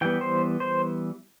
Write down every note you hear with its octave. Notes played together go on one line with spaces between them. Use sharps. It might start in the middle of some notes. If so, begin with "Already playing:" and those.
E3 G3 B3 G5
C5
C5